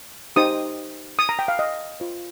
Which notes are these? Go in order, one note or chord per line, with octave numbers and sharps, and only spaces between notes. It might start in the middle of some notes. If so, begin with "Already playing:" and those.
D#4 G4 C5 D#6
D#6
A#5
G5
F5
D#5
F4 C5